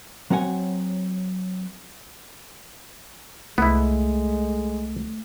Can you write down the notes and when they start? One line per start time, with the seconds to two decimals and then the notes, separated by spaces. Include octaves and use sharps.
0.30 F#3 C4 C#5 F#5 G#5
3.58 C2 G#3 A3 B3 E4